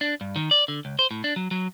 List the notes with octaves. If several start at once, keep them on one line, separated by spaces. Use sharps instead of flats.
D4
G2
D#3
D5
D3
C#2
C5
A2
D4
F#3
F#3